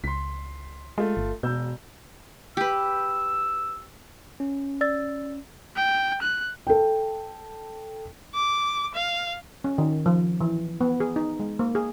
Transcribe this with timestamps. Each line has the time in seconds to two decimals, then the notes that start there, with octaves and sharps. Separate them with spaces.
0.04 C#2 C6 B6
0.98 G#3 A3 F4
1.17 G1
1.43 E1 B2 E6 G6
2.57 G4 B4 E6
4.40 C#4
4.81 D5 E6 A6
5.76 G5
6.22 F#6
6.67 A4 G5
8.34 D6
8.95 F5
9.64 C#4
9.78 D#3
10.06 F3
10.41 E3
10.81 B3
11.00 G#4
11.16 D#4
11.40 G#3
11.59 A#3
11.75 G#4